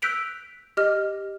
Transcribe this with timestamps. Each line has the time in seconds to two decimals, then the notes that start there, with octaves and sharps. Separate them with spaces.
0.02 E6 F#6 G6 B6 D7 F7
0.77 G4 D#5 F6